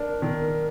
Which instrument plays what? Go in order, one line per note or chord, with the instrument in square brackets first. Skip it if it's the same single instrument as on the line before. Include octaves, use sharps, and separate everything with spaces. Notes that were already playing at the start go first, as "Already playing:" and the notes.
Already playing: [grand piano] D4 [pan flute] A#4
[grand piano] D#3